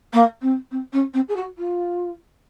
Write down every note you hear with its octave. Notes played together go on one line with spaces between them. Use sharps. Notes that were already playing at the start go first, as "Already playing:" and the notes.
A#3
C4
C4
C#4
C4
G#4
F#4
F4